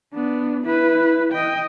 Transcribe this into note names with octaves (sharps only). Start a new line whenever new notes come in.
B3 D4
E4 B4
D#5 G5